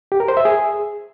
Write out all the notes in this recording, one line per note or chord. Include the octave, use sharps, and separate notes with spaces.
G4
A#4
C5
E5
G#4